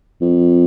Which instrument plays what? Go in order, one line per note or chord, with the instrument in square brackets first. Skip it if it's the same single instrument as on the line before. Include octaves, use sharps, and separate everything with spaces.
[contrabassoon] F2